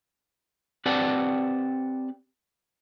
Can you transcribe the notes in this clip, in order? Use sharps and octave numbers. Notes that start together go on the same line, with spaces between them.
C4 G4 B4 D5 F#5 A5